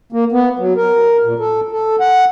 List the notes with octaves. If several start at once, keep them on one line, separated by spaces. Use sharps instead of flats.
A#3
B3
F#3
A#4
A#2
A4
A4
F#5